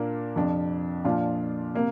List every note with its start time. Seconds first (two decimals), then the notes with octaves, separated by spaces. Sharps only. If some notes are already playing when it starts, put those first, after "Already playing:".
Already playing: A#2 A#3 D4 A#4
0.36 F2 C3 F3 D4
1.05 A#2 F3 D4 F4 D5
1.74 C3 A#3